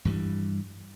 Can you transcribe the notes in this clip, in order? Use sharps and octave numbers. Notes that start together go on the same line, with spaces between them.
G2 E3 F3 G3